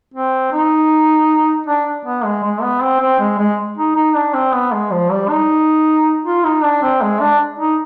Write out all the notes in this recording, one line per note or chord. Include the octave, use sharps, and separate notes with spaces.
C4
D#4
D4
B3
G#3
G#3
B3
C4
C4
G#3
G#3
D#4
D#4
D4
C4
B3
G#3
F3
G3
D#4
F4
D#4
D4
C4
G#3
D4
D#4